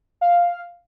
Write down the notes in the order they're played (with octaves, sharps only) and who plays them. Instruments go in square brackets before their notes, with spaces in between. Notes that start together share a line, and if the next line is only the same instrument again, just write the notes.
[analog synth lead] F5